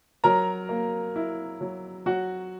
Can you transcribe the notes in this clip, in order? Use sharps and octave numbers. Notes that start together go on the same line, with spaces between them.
F#3 A#4 A#5
A#3
E4
F#3
F#3 F#4 F#5